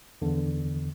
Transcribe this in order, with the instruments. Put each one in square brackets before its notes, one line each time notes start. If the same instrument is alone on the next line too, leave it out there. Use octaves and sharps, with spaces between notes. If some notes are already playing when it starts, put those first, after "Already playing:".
[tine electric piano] E2 D3